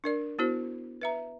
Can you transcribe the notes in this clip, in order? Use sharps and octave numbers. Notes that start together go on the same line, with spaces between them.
D4 A#4 D5
B3 E4 F#4 C5
B4 E5 A#5